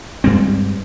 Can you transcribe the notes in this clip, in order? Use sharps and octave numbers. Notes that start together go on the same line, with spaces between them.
G2 G3 G#3 C4